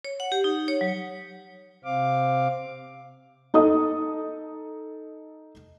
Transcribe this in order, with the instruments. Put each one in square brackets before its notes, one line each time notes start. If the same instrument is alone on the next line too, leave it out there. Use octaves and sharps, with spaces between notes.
[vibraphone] C#5
F#5
G4
D#4
C#5
F#3
[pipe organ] C3 C4 F5 D6
[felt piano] D#4 A4 D#5 D#6